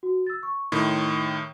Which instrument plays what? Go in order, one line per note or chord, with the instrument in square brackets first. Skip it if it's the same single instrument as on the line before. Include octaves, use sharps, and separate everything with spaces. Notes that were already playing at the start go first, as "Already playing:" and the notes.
[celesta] F#4
E6 A6
C#6
[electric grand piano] A2 D#3 [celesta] C6